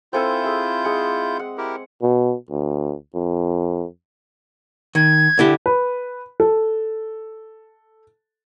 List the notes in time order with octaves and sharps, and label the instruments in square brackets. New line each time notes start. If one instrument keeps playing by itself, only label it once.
[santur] C4 A4 G#5 [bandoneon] E4 F4 G6
[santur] G#4 E5
G#3 G#4 F#5
F#5
[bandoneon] E4 G4 A#4
[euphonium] B2
D2
F2
[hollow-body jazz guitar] D#3 [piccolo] G#6
[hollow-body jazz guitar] D3 E4 G4
[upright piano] B4
A4